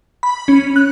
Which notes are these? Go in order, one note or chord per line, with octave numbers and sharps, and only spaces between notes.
B5
C#4
F#6